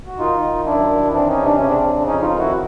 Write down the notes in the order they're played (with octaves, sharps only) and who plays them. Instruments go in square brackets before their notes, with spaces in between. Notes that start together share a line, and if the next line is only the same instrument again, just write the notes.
[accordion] F#4
D#3 D#4 F4
D#3
F#2 D4 E4
D#3
E3 C4 D4
C#4 D#4
C3
D4
C#3 C#4
C4 D4
C#3
F2 C#4 D#4
D#4 F4
D#3
E4 F#4